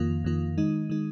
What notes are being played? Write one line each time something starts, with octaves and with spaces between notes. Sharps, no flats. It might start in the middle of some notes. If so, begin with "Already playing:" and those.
Already playing: F2 D#3 A#3 F4
F2 D#3 A#3 F4
D#3 G#3 D#4
D#3 G#3 D#4